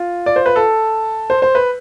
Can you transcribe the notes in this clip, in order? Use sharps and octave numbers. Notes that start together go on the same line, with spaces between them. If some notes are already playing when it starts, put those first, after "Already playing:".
Already playing: F4
D5
C5
B4
A4
C5
C5
B4